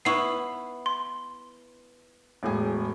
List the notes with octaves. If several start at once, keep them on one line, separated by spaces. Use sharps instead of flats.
B3 E4 B4 C#6 C7
C6
E1 A2 G#4